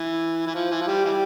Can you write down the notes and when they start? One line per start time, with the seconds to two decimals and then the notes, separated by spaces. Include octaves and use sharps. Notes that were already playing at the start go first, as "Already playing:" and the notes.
Already playing: E3
0.47 E3
0.55 F3
0.71 E3
0.81 F3
0.88 G3
1.05 E3 G3